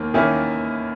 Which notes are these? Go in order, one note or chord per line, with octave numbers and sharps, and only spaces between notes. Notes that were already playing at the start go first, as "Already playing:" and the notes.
Already playing: D#2 D#3 A#3
D#3 A#3 C#4 E4